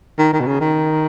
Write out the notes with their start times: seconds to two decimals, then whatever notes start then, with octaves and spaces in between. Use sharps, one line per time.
0.19 D#3
0.33 D#3
0.40 B2
0.47 C#3
0.61 D#3